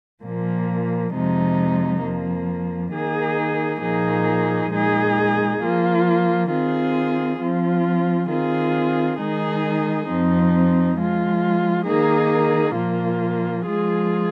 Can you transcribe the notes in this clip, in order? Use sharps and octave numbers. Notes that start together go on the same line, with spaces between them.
A#2 F3 A#3
F2 C3 F3 G#3 D#4
F2 F3 A#3
D#3 A#3 D#4 G#4
A#2 F3 A#3 D#4 G#4
A#2 G#3 D#4 G#4
F3 A#3 F4
D#3 C4 F4 G#4
F3 C4 F4
D#3 C4 F4 G#4
D#3 G#3 D#4 G#4
F2 F3 C4 D#4
F3 G#3 F4
D#3 A#3 D#4 G#4
A#2 F3 A#3 F4
F3 G#3 F4 G#4